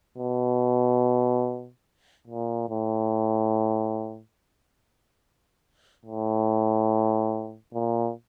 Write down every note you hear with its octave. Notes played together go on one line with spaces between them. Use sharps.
B2
A#2
A2
A2
A#2